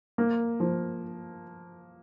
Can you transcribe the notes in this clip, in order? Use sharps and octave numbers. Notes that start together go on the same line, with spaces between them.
A#3
F3